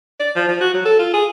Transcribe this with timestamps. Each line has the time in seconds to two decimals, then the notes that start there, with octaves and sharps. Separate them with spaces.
0.20 D5
0.36 F3
0.48 F3
0.61 F#4
0.74 F#3
0.85 A4
0.99 F4
1.13 G#4